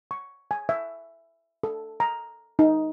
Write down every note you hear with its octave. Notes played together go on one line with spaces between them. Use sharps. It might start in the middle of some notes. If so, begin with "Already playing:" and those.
C#6
G#5
E5
A4
A#5
D#4